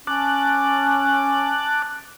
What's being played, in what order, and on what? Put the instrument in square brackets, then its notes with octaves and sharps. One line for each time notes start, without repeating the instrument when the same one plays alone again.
[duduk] C#4 [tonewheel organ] A5 D6 F#6